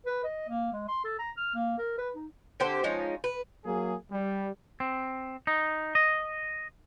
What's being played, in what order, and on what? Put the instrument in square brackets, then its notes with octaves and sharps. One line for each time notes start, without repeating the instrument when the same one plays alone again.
[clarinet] B4
D#5
A#3
G#3
C6
A4
A#5
F6
A#3
A#4
B4
D#4
[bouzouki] D3 C4 G4 C5
F3 G#3 C#4 D#4
B4
[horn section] F#3 A#3 G#4
G3
[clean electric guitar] C4
D#4
D#5